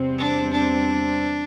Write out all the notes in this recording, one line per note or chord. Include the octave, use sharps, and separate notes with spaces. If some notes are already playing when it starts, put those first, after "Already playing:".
Already playing: E2 C3 G3 C4
D4
D4